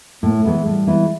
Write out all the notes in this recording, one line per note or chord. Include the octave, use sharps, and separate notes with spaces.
A2 A#3
A3
E3 G#3 B3 E4
A2 G3
E3 G#3 B3 E4